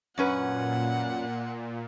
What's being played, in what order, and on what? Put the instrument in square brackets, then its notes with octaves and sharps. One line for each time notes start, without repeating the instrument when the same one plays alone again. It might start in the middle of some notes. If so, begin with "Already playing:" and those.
[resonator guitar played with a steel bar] F#2 C#4 B4 [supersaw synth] A#2 [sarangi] F#5